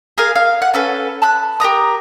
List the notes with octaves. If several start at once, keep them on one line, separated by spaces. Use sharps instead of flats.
G#4 A#4 F5 G#5
F5
F#5
C#4 A4 B4
A5 B5 F#6
G4 A#4 A#5 D#6